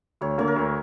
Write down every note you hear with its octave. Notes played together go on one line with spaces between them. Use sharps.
D2 C#5
D3 A#3 C#5
A#4
D2